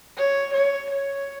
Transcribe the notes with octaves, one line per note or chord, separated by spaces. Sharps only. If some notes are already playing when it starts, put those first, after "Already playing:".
C#5
C#5
C#5